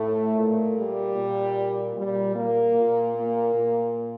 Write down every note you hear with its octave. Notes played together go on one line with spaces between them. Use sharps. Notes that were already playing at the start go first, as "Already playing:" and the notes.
Already playing: A2 A3
A#2
G3
A#2
A#2 G3
A#3
A#2
A#3
A#2